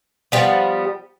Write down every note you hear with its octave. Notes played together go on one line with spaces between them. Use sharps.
F3 G3 B3